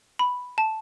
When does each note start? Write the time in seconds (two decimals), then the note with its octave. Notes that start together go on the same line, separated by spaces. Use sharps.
0.19 B5
0.58 A5